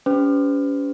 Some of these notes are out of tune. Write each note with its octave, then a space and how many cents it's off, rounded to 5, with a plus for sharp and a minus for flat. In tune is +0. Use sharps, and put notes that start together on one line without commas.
C#4 +35 G4 +0 B4 +40